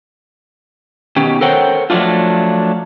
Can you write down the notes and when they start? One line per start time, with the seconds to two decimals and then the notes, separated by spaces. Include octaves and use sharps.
1.16 B2 D#3 C#4 G4
1.41 A4 A#4 C5 C#5 F#5 G5
1.90 F3 F#3 A3 D4 F4